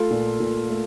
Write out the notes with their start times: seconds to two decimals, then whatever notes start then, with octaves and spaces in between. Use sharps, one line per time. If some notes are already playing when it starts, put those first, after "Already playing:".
Already playing: A3 F4 A4
0.10 A#2
0.40 A#2
0.70 A3